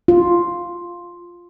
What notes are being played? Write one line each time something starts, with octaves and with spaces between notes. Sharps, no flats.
F4